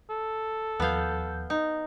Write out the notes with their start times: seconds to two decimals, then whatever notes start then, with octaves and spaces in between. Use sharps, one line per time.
0.10 A4
0.80 D#2 F3 B3 F5 G6
1.50 D#4